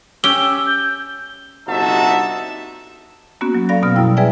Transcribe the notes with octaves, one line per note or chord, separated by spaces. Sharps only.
C#4 G4 G5 E6 G7
G6
G1 C3 D#4 F#4 E5 A5
A#3 B3 C#4 F#4
F#3
F#3 A4 D5 F5 B5 A#6
B2 B3 F6
F#2 B2 G3 E4 G5
G#4 B4 D5 E5 G5 G#5